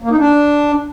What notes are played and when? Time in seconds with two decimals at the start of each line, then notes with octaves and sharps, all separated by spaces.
0.02 A#3
0.10 D#4
0.19 D4